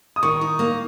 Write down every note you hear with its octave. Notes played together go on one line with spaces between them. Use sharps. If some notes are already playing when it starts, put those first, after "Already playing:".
D#6
D#3 C#6
D#4
A#3